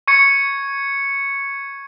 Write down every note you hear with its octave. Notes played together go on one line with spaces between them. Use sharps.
C#6 G#6 C#7